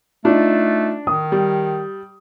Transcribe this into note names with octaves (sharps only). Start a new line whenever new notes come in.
A3 D4 D#4 F4
D#3 D#6
G3